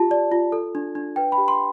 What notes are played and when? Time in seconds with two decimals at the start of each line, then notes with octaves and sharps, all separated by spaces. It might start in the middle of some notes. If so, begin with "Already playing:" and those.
Already playing: F4 G4 A5
0.11 D5
0.32 F4
0.52 A4
0.75 D4
0.95 D4
1.16 B4 G5
1.32 B5
1.38 G4
1.48 C6